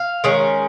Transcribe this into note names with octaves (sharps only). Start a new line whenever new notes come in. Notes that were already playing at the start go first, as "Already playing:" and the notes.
Already playing: F5
D#3 G#3 C#4